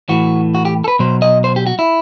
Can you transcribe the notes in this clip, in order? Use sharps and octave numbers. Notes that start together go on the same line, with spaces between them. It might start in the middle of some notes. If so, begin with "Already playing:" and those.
A2 E3 F#4
F#4
G4
A4
B4
B2 F#3 C5
D#5
C5
G4
F#4
E4